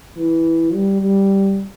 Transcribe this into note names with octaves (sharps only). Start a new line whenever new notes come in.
E3
G3
G3